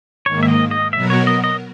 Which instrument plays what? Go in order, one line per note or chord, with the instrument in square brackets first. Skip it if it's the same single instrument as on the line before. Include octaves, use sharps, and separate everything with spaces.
[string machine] G#2 D#3 A#3 [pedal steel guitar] C#5
[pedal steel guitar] E5
D#5
D#5
[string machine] B2 F#3 B3 F#4 A#4 [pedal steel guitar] E5
[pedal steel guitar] C#5
D#5
D#5